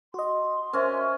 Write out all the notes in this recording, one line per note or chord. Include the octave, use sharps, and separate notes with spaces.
F#4 D#5 C6
C#4 A#4 C5 E5 G#5